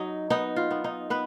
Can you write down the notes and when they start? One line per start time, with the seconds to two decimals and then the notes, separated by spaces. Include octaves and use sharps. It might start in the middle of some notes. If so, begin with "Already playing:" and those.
Already playing: F#3 D#4
0.30 B3 D#4
0.56 F4
0.71 B3
0.84 D#4
1.10 B3 B4